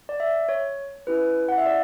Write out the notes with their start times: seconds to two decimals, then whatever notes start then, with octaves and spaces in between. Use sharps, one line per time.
0.09 D5
0.20 E5
0.49 C#5
1.07 C#4 E4 G4 B4
1.49 F#5
1.58 E5
1.66 D5